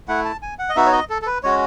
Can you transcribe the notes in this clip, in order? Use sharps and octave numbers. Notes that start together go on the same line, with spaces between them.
A3 E4 F#5
A5
G#5
F#5
D#5
B3 D#4 F#4 E5
C#5
D#5
A4
A4
B4
G#3 C#4 F#4 C#5